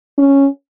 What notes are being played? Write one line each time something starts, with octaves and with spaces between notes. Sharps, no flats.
C#4